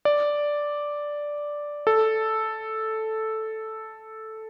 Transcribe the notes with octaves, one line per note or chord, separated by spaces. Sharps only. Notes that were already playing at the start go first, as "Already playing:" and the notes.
D5
A4